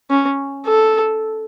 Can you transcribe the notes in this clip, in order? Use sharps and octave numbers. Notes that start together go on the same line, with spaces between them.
C#4
A4